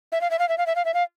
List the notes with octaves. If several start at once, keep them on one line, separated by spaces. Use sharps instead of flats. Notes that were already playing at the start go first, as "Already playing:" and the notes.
E5
F5
E5
F5
E5
F5
E5
F5
E5
F5